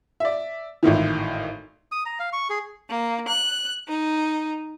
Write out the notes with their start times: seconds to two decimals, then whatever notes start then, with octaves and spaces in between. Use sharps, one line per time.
0.20 D5 E5
0.83 G#1 A2 D#3 E3
1.92 D#6
2.06 A#5
2.20 F5
2.33 C#6
2.50 G#4
2.89 A#3
3.27 F#6
3.88 D#4